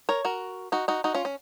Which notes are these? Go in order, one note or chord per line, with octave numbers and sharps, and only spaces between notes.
A#4 C#5
F#4 A#4
D#4 F#4
D#4 F#4
D#4 F#4
C#4 F4
C#4